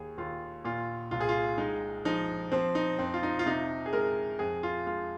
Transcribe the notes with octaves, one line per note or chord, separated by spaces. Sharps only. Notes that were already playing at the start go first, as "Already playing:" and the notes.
Already playing: D#2 G#4
D#2 F4
A#2 F4
C2 F4
G#4
F4
G#3 D#4
F3 D#4
F3 C4
D#4
F2 C4
F4
D#4
F4
C3 D#4
G#4
G#3 A#4
F2 G#4
F4
G#3 F4